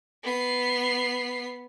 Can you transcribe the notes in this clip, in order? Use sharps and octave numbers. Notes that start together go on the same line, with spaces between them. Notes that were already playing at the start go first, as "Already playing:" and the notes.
B3 C7